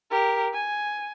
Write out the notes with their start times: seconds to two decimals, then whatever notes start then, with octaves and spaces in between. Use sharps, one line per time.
0.11 G4 A#4
0.53 G#5